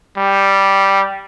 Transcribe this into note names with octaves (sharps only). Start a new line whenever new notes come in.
G3